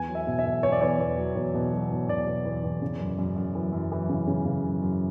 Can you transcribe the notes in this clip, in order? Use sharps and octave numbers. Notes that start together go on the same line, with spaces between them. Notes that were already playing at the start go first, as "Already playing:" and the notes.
Already playing: E2 G#5
F#3
E5
B2
E5
E2
E2 C#5
D5
E2 C#5
E2
F#3
E2
B2
F#3
E2
B2 D5
B2
E2
E2
C#3
F#2
F#2
F#2
E3
F#2
E3
C#3
C#3
C#3
F#2
F#2